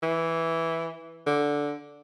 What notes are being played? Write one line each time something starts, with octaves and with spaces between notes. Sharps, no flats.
E3
D3